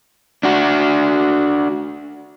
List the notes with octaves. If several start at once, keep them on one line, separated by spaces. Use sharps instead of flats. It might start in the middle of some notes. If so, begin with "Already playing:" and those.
D4 F#4